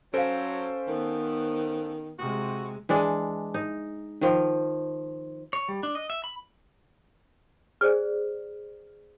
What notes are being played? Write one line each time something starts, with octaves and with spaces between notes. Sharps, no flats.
F#3 C#4 A4 C5 F5 D7
D#3 B3
C3 G#3 F#4
E3 G#3 D4
D#4
D#3 F3
C#5
G3
D4
D#5
E5
B5
G#4 C5 D5 F6